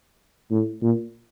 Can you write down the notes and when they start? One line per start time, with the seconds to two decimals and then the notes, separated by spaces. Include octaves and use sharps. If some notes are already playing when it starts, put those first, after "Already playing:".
0.51 A2
0.82 A#2